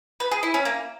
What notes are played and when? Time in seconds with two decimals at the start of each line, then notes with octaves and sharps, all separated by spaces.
0.20 B4
0.31 G#4
0.43 E4
0.54 C#4
0.65 A#3